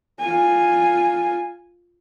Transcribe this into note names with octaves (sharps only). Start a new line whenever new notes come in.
F4 G#5